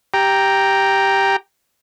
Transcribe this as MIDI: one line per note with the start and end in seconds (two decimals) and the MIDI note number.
0.14 1.36 67
0.14 1.36 79
0.14 1.36 82